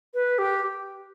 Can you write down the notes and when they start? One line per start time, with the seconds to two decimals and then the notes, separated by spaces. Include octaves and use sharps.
0.14 B4
0.38 G4